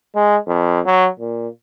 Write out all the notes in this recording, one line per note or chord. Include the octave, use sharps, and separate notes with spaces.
G#3
F2
F#3
A#2